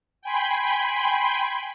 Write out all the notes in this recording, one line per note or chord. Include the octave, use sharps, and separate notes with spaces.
G5 G#5 B5 C6